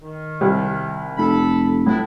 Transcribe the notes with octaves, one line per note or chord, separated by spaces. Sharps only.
D#3
C2
F1 A4 B5
A2 B3 D4 E4